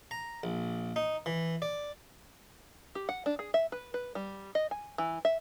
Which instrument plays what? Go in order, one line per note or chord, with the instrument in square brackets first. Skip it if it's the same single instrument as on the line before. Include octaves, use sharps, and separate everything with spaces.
[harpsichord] A#5
A#1
D#4
E3
D5
[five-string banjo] G4
F#5
D4
G#4
E5
B4
B4
G3
D#5
G#5
E3
E5